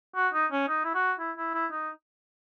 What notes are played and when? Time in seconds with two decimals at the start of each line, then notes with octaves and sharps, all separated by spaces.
0.16 F#4
0.34 D#4
0.52 C#4
0.69 D#4
0.85 E4
0.94 F#4
1.20 E4
1.38 E4
1.54 E4
1.71 D#4